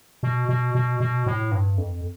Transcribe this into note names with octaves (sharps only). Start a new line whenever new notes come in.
B2
B2
B2
B2
A2
G2
F2